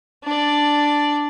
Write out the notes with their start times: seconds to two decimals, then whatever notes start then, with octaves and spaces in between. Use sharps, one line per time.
0.24 D4 D5